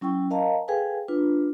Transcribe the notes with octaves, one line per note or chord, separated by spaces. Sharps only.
F#3 C#4 E4 G5 C#6
A#4 D#5 F5 A5 A#5
G#4 A4 B4 F5 G5 G#5
D4 F4 B4